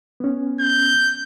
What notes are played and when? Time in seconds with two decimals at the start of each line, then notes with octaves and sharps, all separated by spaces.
0.20 B3 C#4
0.60 G6